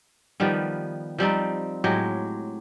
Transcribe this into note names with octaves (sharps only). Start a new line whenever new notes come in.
D#3 F3 G3 B3
F3 G3 C4 D#4
A2 F#3 G#3 G4